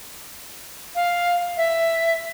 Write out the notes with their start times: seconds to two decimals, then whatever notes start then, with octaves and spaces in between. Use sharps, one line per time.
0.95 F5
1.57 E5